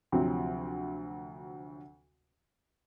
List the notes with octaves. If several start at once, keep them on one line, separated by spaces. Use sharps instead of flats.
D2 C3 F3 F#3 C4